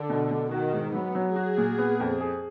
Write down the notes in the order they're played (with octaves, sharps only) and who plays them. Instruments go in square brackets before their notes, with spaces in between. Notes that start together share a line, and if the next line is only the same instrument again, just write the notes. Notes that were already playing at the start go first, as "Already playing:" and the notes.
Already playing: [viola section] D3
[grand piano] B2
B2
[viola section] D#3 [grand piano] F#4
[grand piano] G#2
[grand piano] F#3 [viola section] B3
[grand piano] F#3
[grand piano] F#4 [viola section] G#4
[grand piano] A#2
B3
F2
G#4